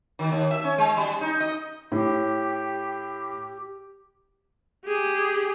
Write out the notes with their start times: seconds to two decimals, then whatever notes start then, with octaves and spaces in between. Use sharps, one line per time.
0.19 D#3
0.32 D#2
0.51 E5
0.64 C#4
0.78 G#3
0.96 G3
1.21 D#4
1.40 D#5
1.92 A2 G4
4.86 G4 G#4